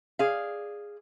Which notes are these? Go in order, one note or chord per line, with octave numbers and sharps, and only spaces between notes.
G#4 D5 F5